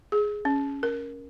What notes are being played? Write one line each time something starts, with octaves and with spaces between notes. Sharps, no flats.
G#4
C#4
A#4